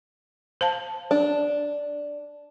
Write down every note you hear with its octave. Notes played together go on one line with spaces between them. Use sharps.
C5 F5 A5
D4